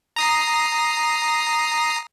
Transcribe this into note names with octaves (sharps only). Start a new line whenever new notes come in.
A#5 D#6 C7